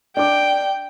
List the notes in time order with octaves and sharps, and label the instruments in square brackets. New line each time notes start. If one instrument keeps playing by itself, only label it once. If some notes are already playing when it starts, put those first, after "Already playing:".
[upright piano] D4 D6 [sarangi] G5